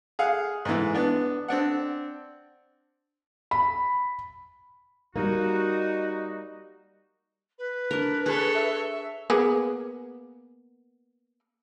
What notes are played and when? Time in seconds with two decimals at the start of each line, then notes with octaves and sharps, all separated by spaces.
0.19 G#4 F5 F#5
0.65 G#2 E3
0.95 B3 D4
1.48 C4 D4 F#5
3.51 B5
5.16 G3 A#3 D#4 F#4
7.58 B4
7.91 D4 A#4
8.26 G#4 A4 C#5
8.55 E5
9.30 A#3 B3 G#4